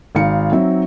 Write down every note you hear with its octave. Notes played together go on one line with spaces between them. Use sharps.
G#1 D#4 F5 C#7
F#3 C4 D#4 E5